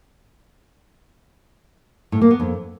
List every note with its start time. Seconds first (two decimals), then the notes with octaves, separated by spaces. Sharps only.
2.12 A2
2.21 A#3
2.31 B3
2.40 F2